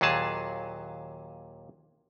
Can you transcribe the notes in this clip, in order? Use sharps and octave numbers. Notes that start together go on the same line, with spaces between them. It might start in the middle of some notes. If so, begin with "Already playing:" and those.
D#2 A#2 F#3 G#4 A5